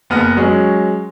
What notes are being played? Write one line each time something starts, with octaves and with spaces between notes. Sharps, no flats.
F#1 B3 F#5 F6 A#6
F#3 G#3 C#4